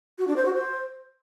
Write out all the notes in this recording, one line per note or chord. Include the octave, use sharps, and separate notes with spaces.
F#4
D4
C5
F#4
C5